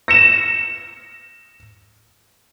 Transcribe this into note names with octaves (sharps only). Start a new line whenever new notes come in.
A#6 C#7 E7